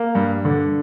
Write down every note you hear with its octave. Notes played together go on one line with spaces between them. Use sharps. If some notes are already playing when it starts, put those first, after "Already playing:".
Already playing: A#3
G2
D3